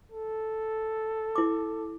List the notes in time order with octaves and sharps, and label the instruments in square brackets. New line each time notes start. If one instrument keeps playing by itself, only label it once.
[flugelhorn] A4
[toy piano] E4 D6